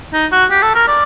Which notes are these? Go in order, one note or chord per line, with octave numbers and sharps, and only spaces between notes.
D#4
F#4
G4
A4
A#4
D5